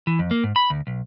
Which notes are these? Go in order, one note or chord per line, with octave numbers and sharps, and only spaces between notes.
E3
F2
A#3
G#2
B5
D2
B1